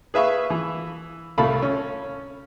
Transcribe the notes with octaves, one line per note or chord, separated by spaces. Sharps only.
G#4 B4 E5 F5 C#6
E3
C2 A2 A3 F5 A5 B5
C#4